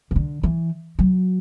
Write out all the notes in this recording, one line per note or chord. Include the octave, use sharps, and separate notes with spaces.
C#3
D3
E3
F#3